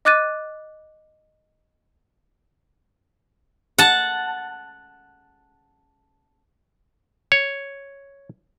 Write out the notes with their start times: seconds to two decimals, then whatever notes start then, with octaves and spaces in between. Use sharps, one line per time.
0.05 D#5 D6 F#6 A6 D#7
3.78 F#5 A5
7.32 C#5